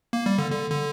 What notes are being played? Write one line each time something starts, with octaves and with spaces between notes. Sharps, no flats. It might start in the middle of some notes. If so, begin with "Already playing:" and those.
A#3
G3
D3
D3
D3